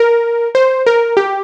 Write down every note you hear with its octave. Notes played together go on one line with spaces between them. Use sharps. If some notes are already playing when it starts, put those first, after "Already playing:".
Already playing: A#4
C5
A#4
G4